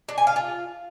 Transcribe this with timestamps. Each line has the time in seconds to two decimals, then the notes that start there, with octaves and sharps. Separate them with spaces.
0.09 D4
0.18 G#5
0.27 F5
0.36 F4